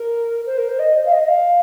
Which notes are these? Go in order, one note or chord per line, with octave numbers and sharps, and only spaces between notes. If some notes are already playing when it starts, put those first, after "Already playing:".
Already playing: A#4
C5
A#4
C5
D#5
C5
F5
D#5
D#5
F5